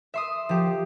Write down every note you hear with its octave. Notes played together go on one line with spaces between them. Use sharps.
E5 C6 D#6
F3 G4